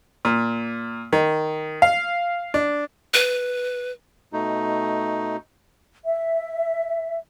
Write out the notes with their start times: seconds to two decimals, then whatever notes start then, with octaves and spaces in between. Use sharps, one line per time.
0.25 A#2
1.13 D#3
1.82 F5
2.54 D4
3.14 B4
4.33 B2 A3 D#4
6.05 E5